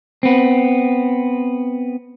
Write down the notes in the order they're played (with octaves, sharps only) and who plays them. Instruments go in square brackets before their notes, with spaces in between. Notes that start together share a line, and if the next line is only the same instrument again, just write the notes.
[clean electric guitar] B3 C4